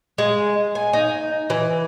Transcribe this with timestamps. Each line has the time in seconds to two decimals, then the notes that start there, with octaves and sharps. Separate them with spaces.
0.18 G#3
0.75 G#5
0.93 D#4
1.50 E3